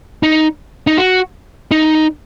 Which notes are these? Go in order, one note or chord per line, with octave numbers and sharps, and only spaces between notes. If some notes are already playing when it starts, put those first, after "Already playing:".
D#4
D#4
F#4
D#4